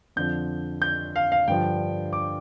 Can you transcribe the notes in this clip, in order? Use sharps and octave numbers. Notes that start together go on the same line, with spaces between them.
F2 D3 F3 G6
G6
F5
F5
G2 D3 F3 G5
D6